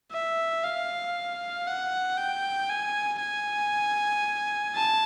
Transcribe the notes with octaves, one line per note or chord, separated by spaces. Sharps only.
E5
F5
F#5
G5
G#5
G#5
A5